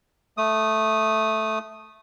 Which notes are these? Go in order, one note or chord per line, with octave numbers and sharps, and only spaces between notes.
A3 D#6